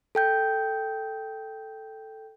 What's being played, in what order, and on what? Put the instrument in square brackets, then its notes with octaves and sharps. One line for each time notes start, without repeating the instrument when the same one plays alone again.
[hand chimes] A4 G5 G6